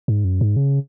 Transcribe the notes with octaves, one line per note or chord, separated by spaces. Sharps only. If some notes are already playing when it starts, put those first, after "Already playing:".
G#2
F#2
G#2
C#3